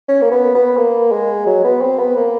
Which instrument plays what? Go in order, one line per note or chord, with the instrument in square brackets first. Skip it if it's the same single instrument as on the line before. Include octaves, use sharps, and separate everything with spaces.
[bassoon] C#4
A#3
B3
B3
A#3
G#3
F#3
B3
C4
B3
A#3